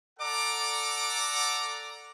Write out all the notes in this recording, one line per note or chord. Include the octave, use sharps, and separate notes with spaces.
A4 D5 F#5 A#5 D6